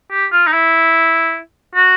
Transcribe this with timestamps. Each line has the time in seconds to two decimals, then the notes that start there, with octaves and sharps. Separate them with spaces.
0.12 G4
0.32 F4
0.47 D#4
0.53 E4
1.76 F#4